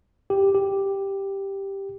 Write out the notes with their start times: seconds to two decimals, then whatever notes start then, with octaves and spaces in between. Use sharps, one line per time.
0.30 G4
0.55 G4